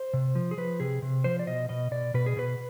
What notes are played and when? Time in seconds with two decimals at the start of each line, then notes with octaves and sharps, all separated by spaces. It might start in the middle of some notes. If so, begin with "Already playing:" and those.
Already playing: C5
0.14 C3
0.35 F3
0.51 G#4
0.57 F3 B4
0.80 C3 G#4
1.02 C3
1.24 F3 C5
1.39 D5
1.47 B2 D#5
1.69 B2 D#5
1.91 B2 D5
2.14 B2 B4
2.26 G#4
2.37 B2 B4